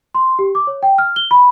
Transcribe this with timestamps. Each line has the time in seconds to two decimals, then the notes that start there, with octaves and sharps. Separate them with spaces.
0.15 C6
0.39 G4
0.55 D6
0.67 C#5
0.83 G5
0.98 F6
1.16 G7
1.31 B5